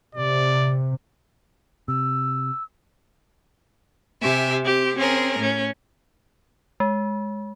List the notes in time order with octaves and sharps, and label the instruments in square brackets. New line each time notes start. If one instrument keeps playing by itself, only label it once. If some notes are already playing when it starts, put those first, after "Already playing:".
[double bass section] C3 [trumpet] D5
[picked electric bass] C3 [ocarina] E6
[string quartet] C3 G4 E5 G#5
C4 G4
C4 C#4 G#4 A#4
A2 C#4
[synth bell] G#3